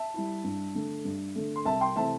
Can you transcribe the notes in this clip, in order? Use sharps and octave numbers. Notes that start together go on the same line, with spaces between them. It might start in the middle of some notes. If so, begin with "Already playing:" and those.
Already playing: E5 A5
G3 E4
G2
D3 A3
G2
D3 A3
C6
C2 E5 A5
G5 C6
C3 E3 A3 C4 E5 A5